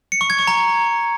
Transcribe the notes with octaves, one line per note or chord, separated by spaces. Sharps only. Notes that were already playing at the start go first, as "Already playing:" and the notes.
C#7
C#6
G#6
C#6
A#5